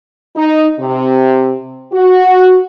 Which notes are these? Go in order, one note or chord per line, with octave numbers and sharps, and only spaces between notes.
D#4
C3
F#4